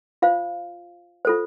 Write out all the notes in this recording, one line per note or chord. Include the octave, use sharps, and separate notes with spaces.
F4 C5 F5
F4 A4 C5